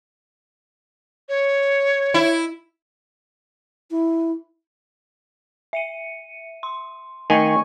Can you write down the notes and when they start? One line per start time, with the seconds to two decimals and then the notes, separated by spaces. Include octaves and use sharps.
1.29 C#5
2.14 E4
3.91 E4
5.73 E5 C#7 D#7
6.63 C6
7.30 D#3 A3 G#5 C#6